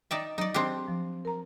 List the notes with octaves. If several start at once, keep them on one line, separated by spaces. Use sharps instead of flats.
D#4 D5 E5 G5
F#3 D#4 D5
C4 D4 G4
F3
A#4 A#5